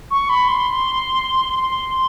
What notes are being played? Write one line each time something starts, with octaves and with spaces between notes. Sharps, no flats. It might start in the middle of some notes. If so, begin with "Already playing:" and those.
C#6
B5
C6
C6